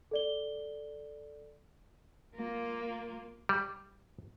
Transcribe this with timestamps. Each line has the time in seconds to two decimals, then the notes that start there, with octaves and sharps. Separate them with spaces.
0.11 A4 D5 G7
2.35 A#3 F4
3.49 G3